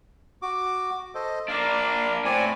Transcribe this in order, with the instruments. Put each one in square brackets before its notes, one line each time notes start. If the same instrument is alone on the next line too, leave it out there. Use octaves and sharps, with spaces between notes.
[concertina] F#4 D6
A4 C5 D#5
[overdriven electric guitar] A#3 D4 [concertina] D5 F5
[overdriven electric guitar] A2 [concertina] C4 D5 G#5